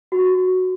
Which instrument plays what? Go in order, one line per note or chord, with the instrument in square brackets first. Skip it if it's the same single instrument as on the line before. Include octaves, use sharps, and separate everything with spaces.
[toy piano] F#4